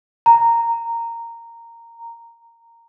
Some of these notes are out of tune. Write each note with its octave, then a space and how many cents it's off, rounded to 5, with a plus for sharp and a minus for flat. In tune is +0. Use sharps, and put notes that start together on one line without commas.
A#5 -10